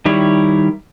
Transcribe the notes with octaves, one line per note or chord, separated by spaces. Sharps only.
D#3 G3 E4 C#5